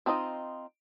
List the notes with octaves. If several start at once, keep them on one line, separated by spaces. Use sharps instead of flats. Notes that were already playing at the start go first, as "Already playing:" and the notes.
C4 D4 D#4 F4 D#5